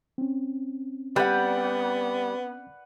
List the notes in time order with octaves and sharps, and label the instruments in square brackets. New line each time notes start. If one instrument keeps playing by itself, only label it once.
[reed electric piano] C4 C#4
[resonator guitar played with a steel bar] G3 [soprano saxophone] B3 [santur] B4 F#5